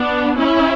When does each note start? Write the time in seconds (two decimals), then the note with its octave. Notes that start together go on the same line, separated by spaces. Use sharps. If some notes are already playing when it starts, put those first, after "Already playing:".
Already playing: B3 D4
0.37 C#4 E4